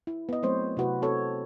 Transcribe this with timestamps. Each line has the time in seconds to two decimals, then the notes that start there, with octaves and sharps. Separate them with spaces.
0.07 E4
0.29 B3 D#5
0.43 F#3 A3 C4 C5 C#5
0.77 C3 E4 F#4 B4
1.02 C4 F#4 A4 C#5